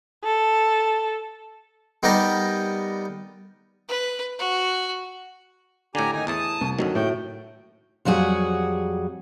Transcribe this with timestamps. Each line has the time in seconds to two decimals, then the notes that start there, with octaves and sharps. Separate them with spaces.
0.24 A4
2.03 G3 B3 D#4 G4 A#4
3.88 B4
4.39 F#4
5.95 A2 D3 G4 G#5 A#5
6.14 D#3 D#4 G#5 A#5
6.27 E2 A2 E3 A5 D#6
6.61 C2
6.79 F#2 D3 D#3 F#3
6.95 A2 F#4 G5
8.05 F2 F#3 G3 F#4 G#4